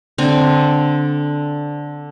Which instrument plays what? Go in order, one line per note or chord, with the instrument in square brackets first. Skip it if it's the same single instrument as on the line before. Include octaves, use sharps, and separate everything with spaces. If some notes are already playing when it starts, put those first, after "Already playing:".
[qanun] D3 C4 G#5